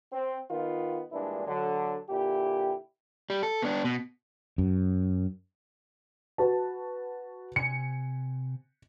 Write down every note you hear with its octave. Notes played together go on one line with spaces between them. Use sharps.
C4
D#3 B3 F4
G2 A#2 E3 G#3 D4 E4
D3 F#3
A#2 D3 E4 G4
G3
A4
B3 D4
B2
F#2
F#4 B4 A5
C3 G#5 C#7